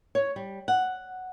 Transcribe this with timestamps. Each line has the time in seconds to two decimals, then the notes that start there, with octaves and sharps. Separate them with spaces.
0.15 C#5
0.36 G3
0.68 F#5